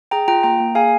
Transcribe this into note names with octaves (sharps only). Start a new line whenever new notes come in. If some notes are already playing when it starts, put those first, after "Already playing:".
G#4 G5 A#5
F4 G5 A#5
A#3 G5 A#5
A#3
G#4 F5 G#5